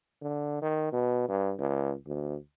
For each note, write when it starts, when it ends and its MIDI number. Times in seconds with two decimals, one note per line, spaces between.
0.22 0.62 50
0.62 0.88 51
0.92 1.24 47
1.29 1.53 43
1.59 1.93 37
2.07 2.36 38